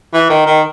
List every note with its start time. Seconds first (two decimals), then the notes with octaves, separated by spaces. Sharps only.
0.13 E3
0.29 D#3
0.46 D#3